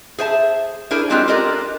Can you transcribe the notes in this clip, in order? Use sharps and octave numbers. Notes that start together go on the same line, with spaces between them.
G#4 C5 E5 A5
D4 E4 G#4 A#4 C5
F#3 G#3 C4 D4 F4 G4
F4 G4 A4 A#4 D5 D#5